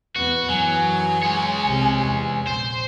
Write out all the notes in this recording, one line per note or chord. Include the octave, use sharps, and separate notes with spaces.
E2 B3 F#4
F#2 E3 F#3 G#5
G#3 C#5
C2 C3
E2
A#1 C5